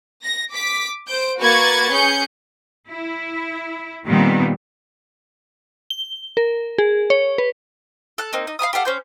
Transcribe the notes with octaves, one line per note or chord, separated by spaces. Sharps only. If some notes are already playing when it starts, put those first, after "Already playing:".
A#6
D6 B6
C5 G6 D7
A#3 F#4 B4 C#6 G#6 A6
C#4 G#4 G6 C#7
E4
A#2 D#3 G3 B3 C4
G7
A#4
G#4
C#5
B4
A4 F#6
A#3 C4 D#4
D#4
F5 G#5 B5 D#6
G4 A4 F5 F#5
C#4 C5 G6